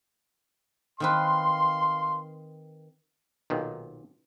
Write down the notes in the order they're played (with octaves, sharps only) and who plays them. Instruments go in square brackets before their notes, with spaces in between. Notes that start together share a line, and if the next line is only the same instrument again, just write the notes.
[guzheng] D#3 C4 B4 [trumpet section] F5 C6
[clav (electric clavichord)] B1 A#2 D#3